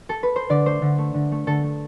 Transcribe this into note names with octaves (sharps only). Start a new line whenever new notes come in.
A4
B4
C5
D3 D5
A3 C5
D3
A3
D3
A3
D3 A4
A3